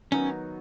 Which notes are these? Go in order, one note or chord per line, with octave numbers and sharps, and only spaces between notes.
D#3 F#3 B3 C#4 D#4 F#4